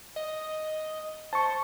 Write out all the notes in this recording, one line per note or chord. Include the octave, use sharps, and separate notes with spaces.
D#5
C5 A5 C#6